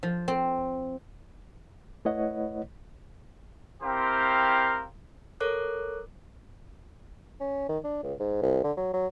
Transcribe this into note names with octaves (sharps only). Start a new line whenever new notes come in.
F3
C4
A3 E4 B4 C#5 D#5 F#5
C4 E4 G4 A#4 C5 F5
A4 A#4 C#5 D6 F#6
C#4
D#3
D4
C#2
G#2
C2
D3
F#3
F#3